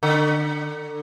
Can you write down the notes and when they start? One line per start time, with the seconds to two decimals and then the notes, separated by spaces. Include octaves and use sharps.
0.03 D3